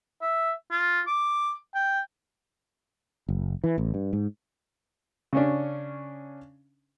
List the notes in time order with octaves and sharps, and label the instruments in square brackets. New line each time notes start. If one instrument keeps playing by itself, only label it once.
[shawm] E5
F4
D6
G5
[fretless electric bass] F#1
E3
A1
G2
G#2
[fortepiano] C#3 C#4 D4